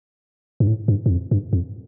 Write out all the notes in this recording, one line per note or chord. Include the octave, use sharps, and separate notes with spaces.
G2
A2
G2
G2
F2
G2
F2